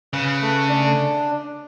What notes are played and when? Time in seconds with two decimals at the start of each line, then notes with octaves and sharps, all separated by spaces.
0.13 C#3 B4
0.41 A3
0.69 D4